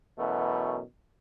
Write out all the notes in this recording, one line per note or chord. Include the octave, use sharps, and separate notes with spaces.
F#2 B2 E3 A3